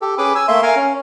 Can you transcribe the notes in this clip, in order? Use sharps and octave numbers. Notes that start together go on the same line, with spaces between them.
G4 A4
C#4 G#4 B4 B5 D6
G#5 E6
A3 A#3 E5 C6
A#4 F5 G#5
C#4